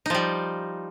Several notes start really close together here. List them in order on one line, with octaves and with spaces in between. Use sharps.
D#4 F3 G3